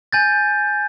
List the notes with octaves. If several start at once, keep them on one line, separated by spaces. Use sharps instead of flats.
G#5 G6 A6